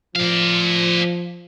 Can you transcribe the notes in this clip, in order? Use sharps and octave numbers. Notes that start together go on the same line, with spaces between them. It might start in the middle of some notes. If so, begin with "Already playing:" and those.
F3 D5 F5